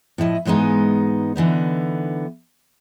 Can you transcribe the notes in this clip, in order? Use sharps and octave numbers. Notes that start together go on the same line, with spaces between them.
A2 F3 E4 D#5
G#2 E3 G#3 B3 D#4
D3 E3 B3 D#4